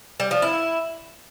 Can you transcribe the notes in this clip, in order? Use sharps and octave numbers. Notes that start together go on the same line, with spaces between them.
G3
F3
E4